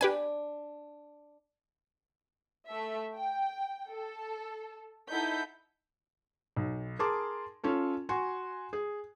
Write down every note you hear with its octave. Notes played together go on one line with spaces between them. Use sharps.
D4 G4 B4 G#5
A3 A4 E5
G5
A4
D#4 E4 A4 F#5 G6 B6
B1
G#4 A#4 A5 C6 D6
C#4 F4 A4
F#4 G#5 C6 C#6
G#4